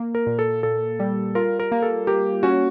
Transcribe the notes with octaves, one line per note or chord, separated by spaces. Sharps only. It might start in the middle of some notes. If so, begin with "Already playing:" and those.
Already playing: A#3
A#4
A#2
A4
A#2 A4
G3
F4 A#4
A#4
A#3
A4
A#3 G4
C#4 F#4